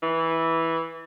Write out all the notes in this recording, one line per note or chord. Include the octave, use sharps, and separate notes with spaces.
E3